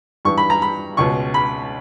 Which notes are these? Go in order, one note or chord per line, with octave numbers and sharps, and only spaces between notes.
G2 E3 C#6
B5
A#5
B5
C#2 B2 C#6
B5